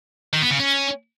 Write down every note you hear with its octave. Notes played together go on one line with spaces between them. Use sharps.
D#3
B3
C#3
C#4